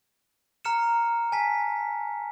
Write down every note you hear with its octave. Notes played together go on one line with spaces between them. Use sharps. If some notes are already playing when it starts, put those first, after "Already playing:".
A#5 F6 C#7 E7
G#5 A5 B6